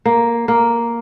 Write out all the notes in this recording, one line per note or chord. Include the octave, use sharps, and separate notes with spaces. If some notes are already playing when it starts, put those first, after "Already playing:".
A#3
A#3